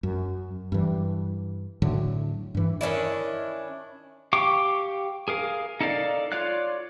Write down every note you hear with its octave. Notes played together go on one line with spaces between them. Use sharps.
F#2
G2 E3
A2 D3 F#3
G2 E3
D#3 C#4 D4 E4
G4 F5 G5 C#6 D6
G#4 A#4 F5
D#4 A4 A#4 D5 F5
F4 C#5 D5 F5 F#6